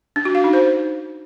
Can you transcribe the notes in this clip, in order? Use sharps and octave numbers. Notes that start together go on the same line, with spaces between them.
D4
F#4
F5
D#4
C5